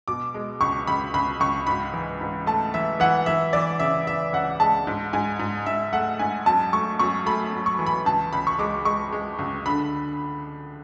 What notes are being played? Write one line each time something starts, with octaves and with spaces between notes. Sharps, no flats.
B2 D6
G#3
C#2 C#6
C#2 B5
C#2 B5
C#2 C#6
G#2 B5
E3
G#2
A3 A5
E3 E5
E3 F#5
E3 E5
E3 D5
C#3 E5
E3 E5
C#2 F#5
G#3 A5
G#2
G#2 G#5
G#2
G#2 E5
A3 F#5
G#2 G#5
F#2 A5
A3 C#6
F#2 C#6
A3 B5
F#2
C#6
E3
B5
C#2 A5
C#2 B5
C#6
G#3 D6
G#3 C#6
G#3
C#2
D3 B5